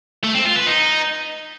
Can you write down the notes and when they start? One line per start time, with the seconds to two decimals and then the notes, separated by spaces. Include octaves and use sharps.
0.24 A3
0.35 C4
0.45 F4
0.56 B4
0.66 D#4